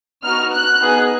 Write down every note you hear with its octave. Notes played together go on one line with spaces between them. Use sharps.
B3 D#4 F#4 F6
F#6
B3 D#4 G#4